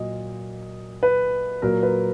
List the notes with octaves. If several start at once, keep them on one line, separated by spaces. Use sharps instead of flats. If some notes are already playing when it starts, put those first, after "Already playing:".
Already playing: A#2 F#3 D#5
B4
A#2 F#3 A#4
B4